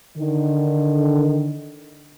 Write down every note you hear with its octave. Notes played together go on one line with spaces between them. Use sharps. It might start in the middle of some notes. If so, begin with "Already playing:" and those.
D3 D#3